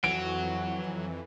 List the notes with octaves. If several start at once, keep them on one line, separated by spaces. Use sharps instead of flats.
F2 E3 F#3 F#4 D7